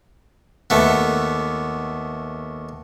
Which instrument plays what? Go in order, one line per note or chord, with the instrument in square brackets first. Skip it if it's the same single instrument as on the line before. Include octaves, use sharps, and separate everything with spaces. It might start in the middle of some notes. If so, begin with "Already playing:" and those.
[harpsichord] D#2 A3 B3